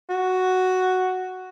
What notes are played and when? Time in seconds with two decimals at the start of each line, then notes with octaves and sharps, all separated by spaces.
0.09 F#4